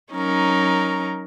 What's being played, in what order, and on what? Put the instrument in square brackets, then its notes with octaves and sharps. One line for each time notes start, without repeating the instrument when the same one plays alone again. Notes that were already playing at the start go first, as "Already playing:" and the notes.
[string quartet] F#3 C#4 D#4 A#4